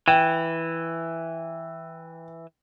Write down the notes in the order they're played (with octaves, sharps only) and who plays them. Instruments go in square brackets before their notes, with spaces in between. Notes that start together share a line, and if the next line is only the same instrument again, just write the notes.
[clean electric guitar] E3 [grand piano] G5